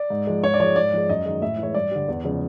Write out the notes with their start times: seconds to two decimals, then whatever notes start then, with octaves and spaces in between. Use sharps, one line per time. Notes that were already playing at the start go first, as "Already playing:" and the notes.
Already playing: D5
0.10 G#2
0.27 F3 G#3
0.43 G#2 C#5
0.54 D5
0.60 F3 G#3 C#5
0.76 G#2 D5
0.93 F3 G#3
1.09 F#2 D#5
1.26 D#3 G#3
1.42 A2 E5
1.58 E3 G#3 C#5
1.74 G2 D5
1.91 D3 G3
2.08 E2
2.25 C#3 F3 G#3